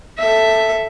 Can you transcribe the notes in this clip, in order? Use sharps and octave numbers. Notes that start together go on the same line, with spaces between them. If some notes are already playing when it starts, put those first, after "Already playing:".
A4 E5